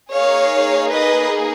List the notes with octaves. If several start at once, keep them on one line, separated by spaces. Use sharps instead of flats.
A#3 D#4 G#4 C#5 F5
B4 D#5